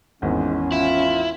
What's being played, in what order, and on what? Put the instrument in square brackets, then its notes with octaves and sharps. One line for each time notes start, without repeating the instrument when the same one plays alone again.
[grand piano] G#1 E2 [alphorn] G#2 [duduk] C#4
[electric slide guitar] E4 [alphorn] F4